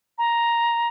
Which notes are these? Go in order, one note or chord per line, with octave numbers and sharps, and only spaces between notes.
A#5